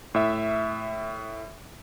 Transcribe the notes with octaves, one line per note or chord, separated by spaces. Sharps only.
A2 E5